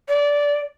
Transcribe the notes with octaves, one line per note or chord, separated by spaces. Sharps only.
D5